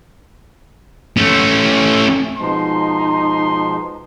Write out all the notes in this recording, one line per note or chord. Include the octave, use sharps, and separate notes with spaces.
A3 C#4
B2 F3 G#3 D#4 C6